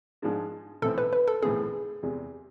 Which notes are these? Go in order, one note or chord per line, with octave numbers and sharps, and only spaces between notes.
G#2 F3 G#3 D4
B1 A2 E3 A3 C4 A4
B4
B4
A4
B1 A2 E3 A3 C4 G#4
E2 C3 G#3